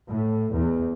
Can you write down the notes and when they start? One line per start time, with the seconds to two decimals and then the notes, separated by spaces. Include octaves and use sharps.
0.10 A2
0.54 E2